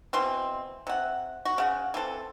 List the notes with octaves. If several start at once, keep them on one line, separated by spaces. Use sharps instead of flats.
B2 E3 C4 C6
C3 F#5
F#4
C#3 F#5
E3 C4 A4